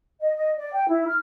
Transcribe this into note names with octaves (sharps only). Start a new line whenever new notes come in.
D#5
D#5
D5
G5
E4
F6